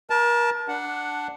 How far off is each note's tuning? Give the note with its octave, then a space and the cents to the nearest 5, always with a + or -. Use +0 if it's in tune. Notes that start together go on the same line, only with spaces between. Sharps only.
A#4 +35 A5 +0
D4 +0 F#5 +0